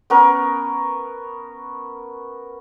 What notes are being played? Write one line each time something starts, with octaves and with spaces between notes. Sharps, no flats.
B3 C#4 A#4